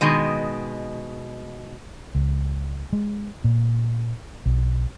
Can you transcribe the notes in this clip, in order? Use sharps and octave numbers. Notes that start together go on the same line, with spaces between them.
B2 D#3 G#3 D#5
C#2
G#3
A#2
B1